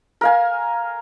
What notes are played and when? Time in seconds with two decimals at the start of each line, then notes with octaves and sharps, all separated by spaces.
0.21 A#4 F5 G#5